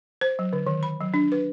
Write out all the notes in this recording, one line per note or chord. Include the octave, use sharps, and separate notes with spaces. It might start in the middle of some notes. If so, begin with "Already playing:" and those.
C5
F#3
D3
D#3
B5
F#3
D4
B4